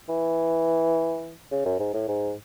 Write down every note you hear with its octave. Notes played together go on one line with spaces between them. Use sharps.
E3
C#3
F#2
G#2
A2
G#2